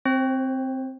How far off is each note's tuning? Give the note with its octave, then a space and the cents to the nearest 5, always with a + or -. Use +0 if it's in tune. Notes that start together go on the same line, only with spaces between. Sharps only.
C4 +0 C5 +35